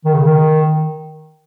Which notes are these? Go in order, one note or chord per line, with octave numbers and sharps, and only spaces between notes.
D#3
C#3
D#3